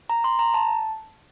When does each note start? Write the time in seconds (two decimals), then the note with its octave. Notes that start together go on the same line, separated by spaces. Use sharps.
0.10 A#5
0.24 C6
0.39 A#5
0.54 A5